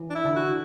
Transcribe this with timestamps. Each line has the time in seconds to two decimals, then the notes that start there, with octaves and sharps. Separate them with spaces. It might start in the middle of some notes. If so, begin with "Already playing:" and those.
Already playing: E3
0.10 D4
0.15 E4
0.25 D3
0.36 F#4